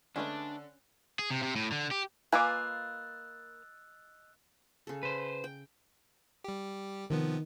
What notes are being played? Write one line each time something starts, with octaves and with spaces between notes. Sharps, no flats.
D3 G#3 A3 C#4 D4 B4 G5
G#4
C3
C3
A2
D3
G4
A#3 F4 B4 D#5 G#5 D6 E6 F#6
C#3 A4
B4 C5
G5
G3 G4
C3 D#3 F3 B3